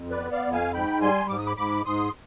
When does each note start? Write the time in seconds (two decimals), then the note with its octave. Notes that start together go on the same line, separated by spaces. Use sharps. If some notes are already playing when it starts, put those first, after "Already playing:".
Already playing: F2
0.10 B4 D5
0.17 B3
0.32 D5 F5
0.46 F2
0.52 F5 G#5
0.74 G#2 G5 B5
1.01 G3 G#5 C6
1.29 G#2 D6
1.38 D#6
1.46 B5 D6
1.57 G#2 B5 D6
1.85 G#2 C6 D#6